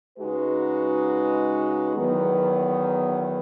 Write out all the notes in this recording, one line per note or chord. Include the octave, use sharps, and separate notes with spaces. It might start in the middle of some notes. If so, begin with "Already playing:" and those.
C#3 G#3 D#4 F#4 B4
E2 D#3 F#3 B3